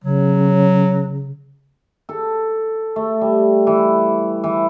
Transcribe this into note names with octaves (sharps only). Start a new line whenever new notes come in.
C#3 F#3
A4
A3
G3
E3
E3